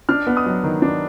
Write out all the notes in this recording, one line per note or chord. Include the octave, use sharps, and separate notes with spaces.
D4 F6
B3
D#6
F#3
D#3
D4